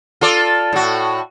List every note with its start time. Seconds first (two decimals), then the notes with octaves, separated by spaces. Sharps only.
0.21 F4 A4 D5
0.73 A2 F#4